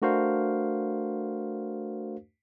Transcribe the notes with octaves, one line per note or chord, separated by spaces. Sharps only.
A3 D4 F#4 A#4 C5 F5